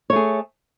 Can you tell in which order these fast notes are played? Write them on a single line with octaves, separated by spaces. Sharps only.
C#5 A3 G#4